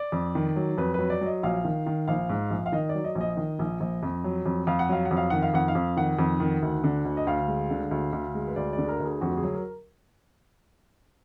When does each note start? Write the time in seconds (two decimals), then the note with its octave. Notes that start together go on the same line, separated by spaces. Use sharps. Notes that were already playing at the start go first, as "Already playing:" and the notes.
Already playing: D5
0.12 F2
0.35 D#3
0.56 F#3
0.78 F2 B4
0.94 F#3 B4
1.10 D5
1.21 F#3 D#5
1.43 A#1 F5
1.65 D#3
1.86 D#3
2.08 A#1 F5
2.29 G#2
2.50 A#1
2.66 F5
2.72 D#3 D#5
2.89 D5
2.95 F#3
3.04 D#5
3.15 A#1
3.21 D#5
3.37 D#3
3.59 A#1
3.80 A#1
4.03 F2
4.24 F#3
4.46 F2
4.67 F2 F5
4.79 F#5
4.89 F#3 F5
5.05 F#5
5.11 F2
5.17 F5
5.30 D#3 F#5
5.42 F5
5.54 F2 F#5
5.68 F5
5.75 F2
5.97 D#3 F#5
6.19 F2
6.40 D#3
6.62 D2
6.84 D3
7.05 D2
7.17 D#5
7.27 D2 F5
7.48 G#3
7.70 D3
7.91 D2
8.13 D2
8.35 G#3
8.48 B4
8.56 D2 D5
8.73 D5
8.78 D3
8.84 G#4
8.89 A#4
9.00 D2
9.05 G#4
9.21 F2 F#4
9.37 G#4
9.43 F#3
9.54 A#4